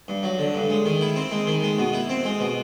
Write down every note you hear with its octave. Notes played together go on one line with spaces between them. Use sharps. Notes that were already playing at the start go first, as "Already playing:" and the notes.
G2
F#3
D3
G2
G#3
D#3
E4
C4
G#3
D#3
G#3
B2
E4
C4
G#3
B2